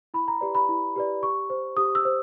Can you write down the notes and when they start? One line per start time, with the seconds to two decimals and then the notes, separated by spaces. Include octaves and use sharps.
0.14 E4 B5
0.28 A#5
0.41 G4 B4 D5
0.55 B5
0.69 E4
0.96 G4 B4 D5
1.22 G4 C#6
1.50 C5
1.77 G4 D#6
1.95 E6
2.05 C5